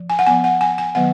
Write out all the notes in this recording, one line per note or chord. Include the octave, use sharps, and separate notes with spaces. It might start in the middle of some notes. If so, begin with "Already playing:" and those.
Already playing: F3
G#5
F#5
F3 B3 G#5
F#5
G#5
G#5
D#3 F#3 B3 F#5